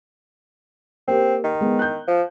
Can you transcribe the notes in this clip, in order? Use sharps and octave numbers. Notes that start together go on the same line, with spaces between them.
A#3 C4 G4 A#4
D#3
G#3 B3
F#6 G6
F3